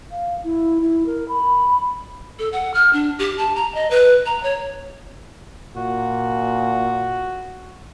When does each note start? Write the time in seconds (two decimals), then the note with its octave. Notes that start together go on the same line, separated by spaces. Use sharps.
0.11 F5
0.43 E4
0.81 E4
1.06 A#4
1.29 B5
2.39 A4
2.53 F#5
2.74 F6
2.93 D4
3.19 G4
3.38 A5
3.56 A#5
3.75 D#5
3.91 B4
4.26 A#5
4.43 C#5
5.76 A#2 F#4